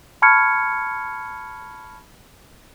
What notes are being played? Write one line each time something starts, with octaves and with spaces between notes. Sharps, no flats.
A5 B5 C#6 F6 G#6 C#7